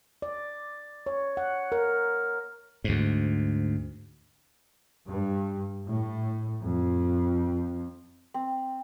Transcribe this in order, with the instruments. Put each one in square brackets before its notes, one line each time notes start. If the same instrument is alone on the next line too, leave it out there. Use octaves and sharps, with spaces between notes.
[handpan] D5
C#5
F#5
A#4
[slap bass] D2 G#2
[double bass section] G2
A2
F2
[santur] C4